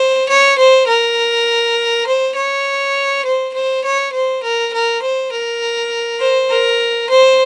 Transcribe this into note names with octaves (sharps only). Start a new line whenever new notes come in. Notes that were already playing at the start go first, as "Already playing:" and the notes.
Already playing: C5
C#5
C5
A#4
C5
C#5
C5
C5
C#5
C5
A#4
A#4
C5
A#4
C5
A#4
C5